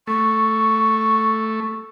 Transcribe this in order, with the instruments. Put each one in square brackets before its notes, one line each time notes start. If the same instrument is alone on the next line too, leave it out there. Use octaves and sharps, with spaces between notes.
[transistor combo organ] A3 [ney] C#6